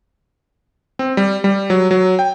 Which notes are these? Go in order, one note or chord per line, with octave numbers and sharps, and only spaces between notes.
C4
G3
G3
F#3
F#3
G5